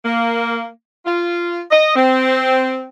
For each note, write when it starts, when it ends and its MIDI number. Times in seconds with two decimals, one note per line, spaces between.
0.05 0.67 58
1.06 1.60 65
1.71 1.95 75
1.96 2.86 60